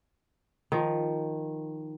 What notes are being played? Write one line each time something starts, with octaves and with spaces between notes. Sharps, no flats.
D#3 F3